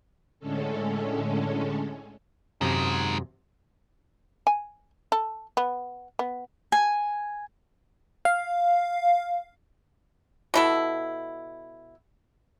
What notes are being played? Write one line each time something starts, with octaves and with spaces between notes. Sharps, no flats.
A2 D3 G#3 C#4 A4
F#2 C3 D#3 G#3
G#5
A4
B3
B3
G#5
F5
B2 E4 A4